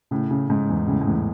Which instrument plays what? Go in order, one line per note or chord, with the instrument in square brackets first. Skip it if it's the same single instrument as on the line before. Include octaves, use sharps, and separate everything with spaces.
[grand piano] A2 [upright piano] C#3
[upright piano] C#3
[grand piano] G#2 [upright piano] C#3
[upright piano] E2
[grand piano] A2 [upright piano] C#3
[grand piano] G#2
[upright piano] E2 [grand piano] A2